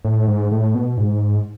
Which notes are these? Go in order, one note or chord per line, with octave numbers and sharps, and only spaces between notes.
A2
G#2
A2
B2
G#2